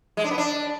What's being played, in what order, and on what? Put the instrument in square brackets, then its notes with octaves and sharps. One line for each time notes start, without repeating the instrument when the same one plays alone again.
[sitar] G#3
D4
B3
D4